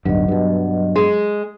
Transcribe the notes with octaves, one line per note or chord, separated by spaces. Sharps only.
D1 B1 G2 F#3 D#5
G2 B2
G#3